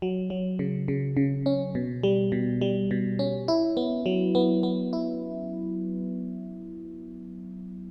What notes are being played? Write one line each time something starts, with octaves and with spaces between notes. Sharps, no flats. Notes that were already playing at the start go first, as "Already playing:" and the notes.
F#3
F#3
C#3
C#3
C#3
C#4
B2
G3
B2
G3
B2
C#4
E4
B3
F#3
B3
B3
E4